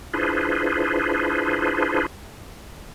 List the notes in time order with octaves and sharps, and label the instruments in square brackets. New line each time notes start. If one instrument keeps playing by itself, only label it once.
[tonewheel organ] D4 E4 F4 G#4 B4 C5